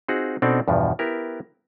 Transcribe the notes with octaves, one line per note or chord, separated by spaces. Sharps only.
C4 D#4 F4 F#4 G#4 F#5
B2 C4 D4 D#4 A4 D5
E2 G2 B2 F3
B3 E4 G4 A#4